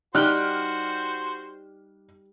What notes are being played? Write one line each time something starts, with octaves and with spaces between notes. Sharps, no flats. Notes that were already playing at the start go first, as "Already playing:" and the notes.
G3 D#4 F#4 C5 G5 F6 F#6